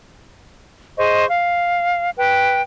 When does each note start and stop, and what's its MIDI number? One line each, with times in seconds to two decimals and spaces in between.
0.98 1.25 68
0.98 1.25 72
0.98 1.25 75
0.98 1.25 85
1.29 2.10 77
2.17 2.61 71
2.17 2.61 79